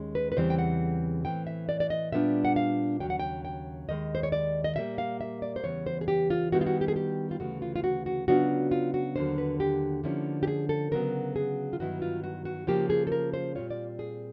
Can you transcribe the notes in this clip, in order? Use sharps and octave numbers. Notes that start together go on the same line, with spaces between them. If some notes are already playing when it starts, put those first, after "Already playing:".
Already playing: D#2 D#3 G#3 C#4
B4
B4
E2 C#3 E3 G3 C4 C5
G5
F#5
A2 E3 A3 C4 G5
E5
D5
D5
D#5
A#2 G3 B3 D4 F4 E5
F#5
F5
D#2 C#3 F#3 G5
F#5
G5
G5
D#2 D#3 G#3 D#5
C5
C#5
D5
D#5
A#2 G3 A#3 E5
F5
E5
D5
C5
E2 C#3 E3 G3 B3 C#5
C5
G#4
G4
F4
D#3 G3 B3 E4 F#4
F4
F#4
G4
G#4
G4
F4
D2 C#3 E3 A3 F#4
F4
F4
F#4
F#4
C#3 F#3 B3 D4 F4 F#4
F4
F#4
D#2 D3 F#3 A#3 C5
B4
G4
D3 F3 A#3 C#4 E4
G4
G#4
A4
C#3 F#3 B3 A#4
G#4
F4
G2 D#3 F#3 B3 E4 F#4
F4
F#4
F#4
C#3 F3 A#3 G4
G#4
A4
A#4
C5
A#2 G3 C4 F4 C#5
D5
G#4